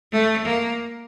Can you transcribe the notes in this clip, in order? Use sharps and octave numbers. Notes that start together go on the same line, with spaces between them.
A3
A#3